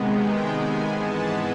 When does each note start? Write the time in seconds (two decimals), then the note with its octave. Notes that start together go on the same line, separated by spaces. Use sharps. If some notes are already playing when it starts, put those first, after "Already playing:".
Already playing: C3 D#3 G#3 B3
0.12 G5
0.51 G#5
0.92 G#2 E3 G#3 B3 A5